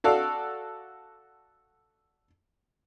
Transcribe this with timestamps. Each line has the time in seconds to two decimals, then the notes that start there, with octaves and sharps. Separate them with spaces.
0.04 F#4 A4 D5 F5